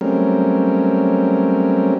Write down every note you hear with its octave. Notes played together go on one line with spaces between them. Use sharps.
F#3 G3 A3 C4 C#4 A#4